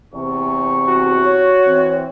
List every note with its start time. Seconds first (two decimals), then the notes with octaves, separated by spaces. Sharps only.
0.14 E2 C3 C4 C#6
0.86 F#4
1.24 C#5
1.66 E3 C4